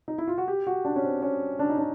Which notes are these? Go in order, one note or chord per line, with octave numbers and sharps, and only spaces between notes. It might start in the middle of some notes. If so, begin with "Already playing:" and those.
D#4
E4
F4
F#4
G4
F#4
D4
C#4
C4
C#4
D4
D#4
D4